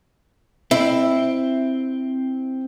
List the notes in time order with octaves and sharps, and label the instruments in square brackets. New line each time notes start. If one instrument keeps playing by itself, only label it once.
[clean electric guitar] C4 [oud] E4